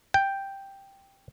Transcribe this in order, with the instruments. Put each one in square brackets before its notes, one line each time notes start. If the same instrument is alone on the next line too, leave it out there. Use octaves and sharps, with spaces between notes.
[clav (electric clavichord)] G5